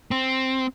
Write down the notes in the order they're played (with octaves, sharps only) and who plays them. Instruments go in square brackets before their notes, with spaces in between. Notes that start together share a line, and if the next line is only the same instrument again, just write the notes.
[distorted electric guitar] C4